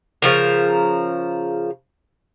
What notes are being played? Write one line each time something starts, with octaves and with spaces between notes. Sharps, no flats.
C#3 F3 A#4